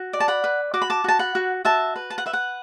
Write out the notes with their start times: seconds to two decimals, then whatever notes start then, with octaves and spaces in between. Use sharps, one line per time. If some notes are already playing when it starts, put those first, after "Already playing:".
Already playing: F#4
0.13 D5
0.20 A5
0.28 F#5 B5
0.44 B4
0.74 F#4 D6
0.82 B5
0.90 A5 D6
1.04 F#4 A5
1.19 F#5 B5
1.35 F#4
1.65 F#4 E5 A5
1.96 B4
2.10 A5
2.18 F#5
2.26 B4 E5
2.33 F#5